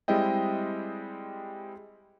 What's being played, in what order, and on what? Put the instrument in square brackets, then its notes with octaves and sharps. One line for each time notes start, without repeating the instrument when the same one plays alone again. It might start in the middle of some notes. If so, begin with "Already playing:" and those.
[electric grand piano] G3 G#3 C4 E4 D#5 G5